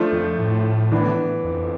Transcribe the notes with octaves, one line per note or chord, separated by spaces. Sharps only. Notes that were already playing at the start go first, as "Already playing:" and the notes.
Already playing: F3 A3 D4 F4 C5
F2
A2
E3 B3 D4
F2